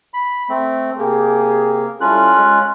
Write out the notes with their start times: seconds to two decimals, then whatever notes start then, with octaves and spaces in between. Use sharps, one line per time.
0.14 B5
0.49 A3 C4
0.98 C3 A#3 G4 G#4
2.01 G3 C#4 E4 F4 A4 F#6
2.35 G#3